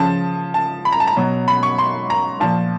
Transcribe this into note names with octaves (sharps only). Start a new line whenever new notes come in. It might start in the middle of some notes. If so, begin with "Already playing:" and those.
Already playing: C#3 F3 A5
A5
B5
A#5
A5
A#5
B2 F#3
B5
C#6
C6
A#5
A#2 F3 A5